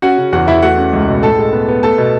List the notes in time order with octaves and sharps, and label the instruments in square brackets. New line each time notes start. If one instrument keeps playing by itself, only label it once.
[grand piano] C#4 F#4 F#5
C#3
E2 F#4 F#5
E2 E4 E5
A3 F#4 F#5
C#4
C#2
B2
A2 A4 A5
G#3
B3
B3
A3 A4 A5
B2